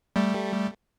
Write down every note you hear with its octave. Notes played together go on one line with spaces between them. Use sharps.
G3 A3